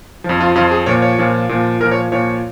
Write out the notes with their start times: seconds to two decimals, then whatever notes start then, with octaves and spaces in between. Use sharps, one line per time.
0.24 F2 F3
0.40 F4
0.55 F2 F4
0.59 F3
0.71 G#4
0.86 A#2 F3 C#5
1.02 C#5
1.19 A#2 F3
1.49 A#2 F3
1.80 A#2 A#4
1.84 F3
1.91 C#5
2.12 A#2 F3 C#5